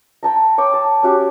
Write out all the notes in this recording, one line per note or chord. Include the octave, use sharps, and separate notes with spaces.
G5 A5 A#5
C#5 G5 D6
A5
C#4 F#4 G4